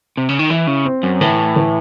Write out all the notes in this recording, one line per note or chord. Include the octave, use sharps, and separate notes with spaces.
C3
C#3
D#3
E3 E4
C#3
C4
F#2
A2 E3
E3